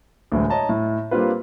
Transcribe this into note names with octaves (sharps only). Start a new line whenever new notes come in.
D2 A2 E3 G#3
C#5 D#5 A5 A#5
A2
G3 A#3 C4 D4 F4 B4